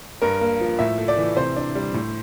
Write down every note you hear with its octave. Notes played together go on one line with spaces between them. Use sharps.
G2 A#4
A#3
F3
A2 E5
A3
D5
E3
C3 C5
D4
G3
A2